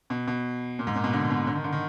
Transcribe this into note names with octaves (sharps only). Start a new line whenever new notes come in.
B2
B2
A#2
G#2
A#2
B2
D3
B2
D3
D#3
D3
D#3